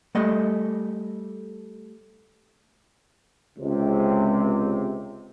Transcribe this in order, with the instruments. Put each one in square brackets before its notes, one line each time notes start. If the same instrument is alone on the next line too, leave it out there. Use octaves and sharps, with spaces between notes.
[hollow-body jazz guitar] G3 A3 D#5
[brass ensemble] C#2 C3